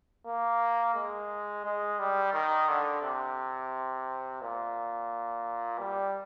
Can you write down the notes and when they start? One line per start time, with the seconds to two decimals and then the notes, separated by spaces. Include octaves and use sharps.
0.26 A#3
0.95 G#3
1.64 G#3
1.99 G3
2.33 D#3
2.68 D3
3.02 C3
4.41 A#2
5.79 G3